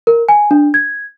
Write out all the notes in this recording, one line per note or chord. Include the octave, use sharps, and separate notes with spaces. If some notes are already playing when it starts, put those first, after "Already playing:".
A#4
G#5
D4
G#6